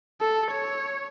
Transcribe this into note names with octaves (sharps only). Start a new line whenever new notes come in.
A4
C#5